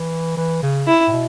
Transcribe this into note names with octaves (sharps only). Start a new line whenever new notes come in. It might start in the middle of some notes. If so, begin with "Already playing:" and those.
Already playing: E3
E3
C#3
E4
A2
B2